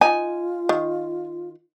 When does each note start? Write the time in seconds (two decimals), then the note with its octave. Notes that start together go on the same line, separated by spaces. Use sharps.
0.01 D#4 F4 G#5
0.69 D#3